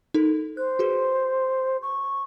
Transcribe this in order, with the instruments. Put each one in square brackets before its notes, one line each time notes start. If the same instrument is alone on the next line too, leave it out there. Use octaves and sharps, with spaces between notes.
[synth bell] D#4 A4 A#4
[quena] C5 [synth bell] F#6
[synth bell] F#4 G#4 B4
[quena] C#6